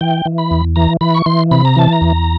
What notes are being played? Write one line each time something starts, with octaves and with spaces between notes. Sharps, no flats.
E3 G5
E3
B5
E2
E3 A#5
E3 B5
C#6
E3 C6
C3 B5
A#5
E3 A5
A#5
E2